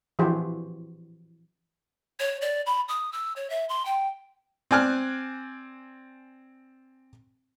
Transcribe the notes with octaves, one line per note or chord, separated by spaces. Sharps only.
E3 F3 D4 F#4 G4 C5
C#5
D5
B5
D#6
E6
C#5
E5
C6
G5
C4 D5 G#5 F6 F#6